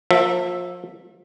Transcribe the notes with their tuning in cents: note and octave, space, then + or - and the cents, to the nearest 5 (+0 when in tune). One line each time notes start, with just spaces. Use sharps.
F3 +35 A#3 +0 E5 +0